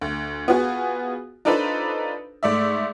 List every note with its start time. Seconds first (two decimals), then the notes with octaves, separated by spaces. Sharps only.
0.01 D2
0.48 B3 F4 F#4 G#4
1.45 D4 D#4 F4 A4 B4 C5
2.43 G#2 A3 D5 E5